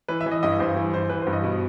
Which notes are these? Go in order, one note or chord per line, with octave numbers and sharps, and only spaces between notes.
E3 B4
E5
E3
D#5
G2 D#5
G2 C5
E3
E3 C5
E3 B4
C5
G2
D#5
B2